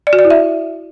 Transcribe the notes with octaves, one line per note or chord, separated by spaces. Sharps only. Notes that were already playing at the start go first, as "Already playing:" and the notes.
D5
F#4
D5
E4
E5